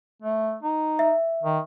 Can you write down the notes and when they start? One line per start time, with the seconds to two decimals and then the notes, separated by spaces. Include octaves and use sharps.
0.22 A3
0.63 D#4
0.99 E5
1.43 D#3